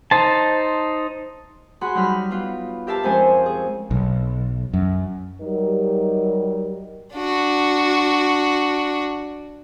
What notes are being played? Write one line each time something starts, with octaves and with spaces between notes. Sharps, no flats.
D#4 C5 A5
F#4 G#4 F#5 B5 C6
F#3 G3 D#4 B5 F6
B3 F4
G4 A#4 E5 F5 A5
F2 G#3 C4 C#4 C5 G#5
G#4
B1
F#2
F#3 G3 D#4 G4 A#4
D4 F#4